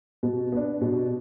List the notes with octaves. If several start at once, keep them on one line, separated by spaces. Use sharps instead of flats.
B2
B3 D4
B2